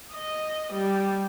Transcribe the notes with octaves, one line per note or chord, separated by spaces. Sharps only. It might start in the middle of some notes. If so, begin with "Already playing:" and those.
D#5
G3